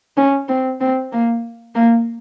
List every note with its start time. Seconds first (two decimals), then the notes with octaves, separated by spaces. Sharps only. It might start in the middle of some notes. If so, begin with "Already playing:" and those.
0.17 C#4
0.48 C4
0.80 C4
1.12 A#3
1.75 A#3